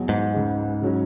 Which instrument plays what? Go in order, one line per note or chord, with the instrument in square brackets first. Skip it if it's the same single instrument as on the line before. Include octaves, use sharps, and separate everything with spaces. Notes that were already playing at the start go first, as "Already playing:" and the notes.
Already playing: [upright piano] E2 B2 F#3
[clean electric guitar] G#2
[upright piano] C#2 C#3 G#3
C#3 F#3 C#4 F#4